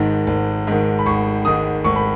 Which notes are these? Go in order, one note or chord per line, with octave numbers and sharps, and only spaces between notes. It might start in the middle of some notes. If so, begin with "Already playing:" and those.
Already playing: G#1 G#2 D#3
G#1
G#2 D#3
B5
G#1 C#6
G#2 D#3 D#6
G#1 C#6
B5